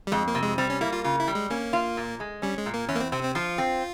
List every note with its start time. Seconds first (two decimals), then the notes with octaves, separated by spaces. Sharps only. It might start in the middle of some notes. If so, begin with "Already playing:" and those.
0.07 G3
0.12 F2 G#3
0.28 A#3
0.35 C3
0.43 G#3
0.58 G3 C4
0.70 C#4
0.81 A#3 E4
0.93 F4
1.04 C#3 F4
1.20 E4
1.28 G3
1.35 G#3
1.50 A#3 C#4
1.73 F4
1.97 A#2
2.20 G#3
2.42 G3 C#4
2.58 G#3
2.66 A#2
2.74 A#3
2.88 E2 C#4
2.96 A#3
3.00 C4
3.12 C3 C4
3.23 C4
3.35 F3 F4
3.58 C4